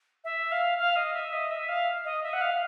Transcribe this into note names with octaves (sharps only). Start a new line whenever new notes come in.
E5
F5
F5
D#5
E5
D#5
E5
F5
D#5
E5
F#5
F5